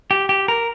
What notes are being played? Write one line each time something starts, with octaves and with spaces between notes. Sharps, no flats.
G4
G4
A#4